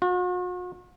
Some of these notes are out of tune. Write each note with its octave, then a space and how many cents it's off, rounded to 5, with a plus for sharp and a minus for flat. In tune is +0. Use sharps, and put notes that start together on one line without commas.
F#4 -45